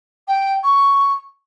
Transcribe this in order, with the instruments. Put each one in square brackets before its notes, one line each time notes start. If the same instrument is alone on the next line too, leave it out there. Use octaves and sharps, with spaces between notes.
[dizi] G5
C#6